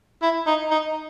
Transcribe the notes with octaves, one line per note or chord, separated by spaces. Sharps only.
E4
D#4
D#4